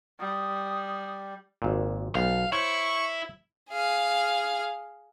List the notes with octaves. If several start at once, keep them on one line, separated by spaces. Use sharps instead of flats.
G3 D#6
G#1 A#2
B1 F5
E4 C5 C#5 C#6
G#4 F5